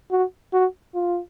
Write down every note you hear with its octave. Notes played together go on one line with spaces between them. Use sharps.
F#4
F#4
F4